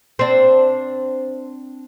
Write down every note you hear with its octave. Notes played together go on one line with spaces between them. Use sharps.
C4 D4